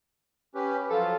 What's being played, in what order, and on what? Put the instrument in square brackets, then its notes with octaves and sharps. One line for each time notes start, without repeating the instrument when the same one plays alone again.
[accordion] C#4 G4 B4
[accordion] F3 F#3 F4 [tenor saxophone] A4